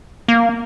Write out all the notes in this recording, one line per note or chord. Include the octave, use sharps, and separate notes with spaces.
A#3